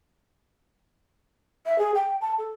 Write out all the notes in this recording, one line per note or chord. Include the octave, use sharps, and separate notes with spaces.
E5
G#4
G5
A5
A4